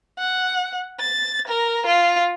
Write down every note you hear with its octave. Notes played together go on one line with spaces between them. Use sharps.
F#5
A6
A#4
F4